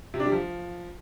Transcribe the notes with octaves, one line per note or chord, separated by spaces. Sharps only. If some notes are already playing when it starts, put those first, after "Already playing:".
C3
D4
G3
F3